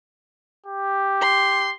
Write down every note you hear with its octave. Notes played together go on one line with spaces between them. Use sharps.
G4
C6